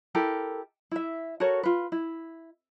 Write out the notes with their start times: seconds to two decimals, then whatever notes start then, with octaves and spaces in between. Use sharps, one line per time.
0.15 E4 G4 A4 A#4
0.91 E4 E5
1.40 F#4 A4 A#4 C#5
1.63 F4 B4
1.92 E4